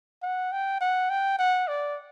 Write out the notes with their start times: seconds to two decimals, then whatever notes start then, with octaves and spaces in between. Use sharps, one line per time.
0.23 F#5
0.52 G5
0.81 F#5
1.10 G5
1.39 F#5
1.68 D5